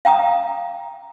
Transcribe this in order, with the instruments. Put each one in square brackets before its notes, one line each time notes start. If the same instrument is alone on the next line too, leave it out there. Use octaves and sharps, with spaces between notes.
[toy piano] F5 G5 A#5 D#6